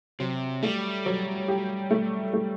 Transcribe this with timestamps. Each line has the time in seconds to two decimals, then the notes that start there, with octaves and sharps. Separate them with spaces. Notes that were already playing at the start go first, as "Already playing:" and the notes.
0.20 C3 F#3
0.63 G3 A3
1.06 F#3
1.48 G4
1.91 A3
2.33 A3